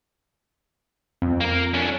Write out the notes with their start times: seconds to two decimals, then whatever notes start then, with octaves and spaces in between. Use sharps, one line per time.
1.22 F2
1.41 A#3 A#4
1.74 C#4 D4